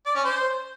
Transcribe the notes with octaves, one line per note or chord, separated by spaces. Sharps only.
D5
C#4
C5